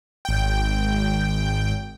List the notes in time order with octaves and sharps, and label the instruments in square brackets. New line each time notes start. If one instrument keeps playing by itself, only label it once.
[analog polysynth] G#1 G5